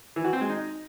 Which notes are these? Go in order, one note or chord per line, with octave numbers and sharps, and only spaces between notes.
E3
F#4
C4
G#3
D#4